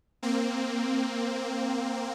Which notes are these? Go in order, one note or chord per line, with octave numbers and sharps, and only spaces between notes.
A#3 C4